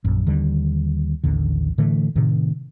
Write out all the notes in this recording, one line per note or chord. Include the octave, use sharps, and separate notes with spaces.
A#1 F#2
D#2 D3 G3
A1 D#2 D3
A2 D3 E3 A3
A2 C3 D#3